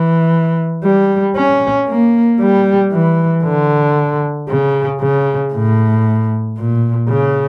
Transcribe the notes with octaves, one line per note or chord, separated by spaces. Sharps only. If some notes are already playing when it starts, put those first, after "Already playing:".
Already playing: E3
G3
C#4
A#3
G3
E3
D3
C#3
C#3
A2
A#2
C#3